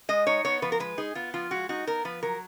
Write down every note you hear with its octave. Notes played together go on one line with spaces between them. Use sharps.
G#3 D#5
D#4 C#5
B3 C#5
F3 B4
A#4
G#3 B4
D#4 G#4
B3 F4
F3 F4
G#3 F#4
D#4 F#4
B3 A#4
F3 B4
F#3 A#4